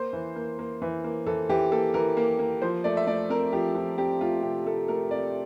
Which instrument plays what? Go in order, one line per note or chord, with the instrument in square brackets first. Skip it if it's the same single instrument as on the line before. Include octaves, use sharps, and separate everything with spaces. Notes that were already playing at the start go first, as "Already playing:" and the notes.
Already playing: [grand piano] A#3 C5
E3
A#3
A#3
E3
A#3
E3 A4
E3 G4
A#3 A4
E3 A#4
A#3
A#3
F3 C5
A3 D5
E5
A3 D5
C4 A#4
F3 G4
F3
C4 G4
A3 F4
C3 G4
A3 A4
A3 A#4
C3 D5